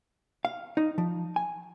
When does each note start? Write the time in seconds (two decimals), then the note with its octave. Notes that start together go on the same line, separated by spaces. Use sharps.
0.45 F5
0.77 D#4
0.98 F3
1.36 G#5